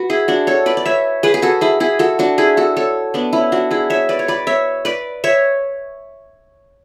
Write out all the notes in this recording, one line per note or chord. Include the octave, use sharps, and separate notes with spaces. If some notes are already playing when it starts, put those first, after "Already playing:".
Already playing: F#4 B4
E4 G#4
D4 F#4
A4 C#5
B4 D5
D5
C#5 E5
G#4 B4
G#4
F#4 A4
E4 G#4
E4 G#4
F#4 A4
D4 F#4
E4 G#4
F#4 A4
A4 C#5
B3 D4
C#4 E4
D4 F#4
E4 G#4
C#5 E5
B4 D5
C#5
B4 D5
C#5 E5
B4 D5
C#5 E5